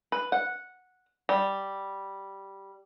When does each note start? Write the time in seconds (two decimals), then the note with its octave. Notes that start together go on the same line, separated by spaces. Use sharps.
0.12 B4
0.32 F#5
1.29 G3